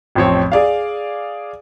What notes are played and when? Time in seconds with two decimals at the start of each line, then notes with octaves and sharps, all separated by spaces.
0.15 A1 F2 C4 C#5
0.52 G#4 D5 F5